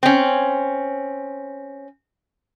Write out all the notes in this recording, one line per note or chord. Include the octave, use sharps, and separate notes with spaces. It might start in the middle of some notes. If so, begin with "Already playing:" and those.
C4 C#4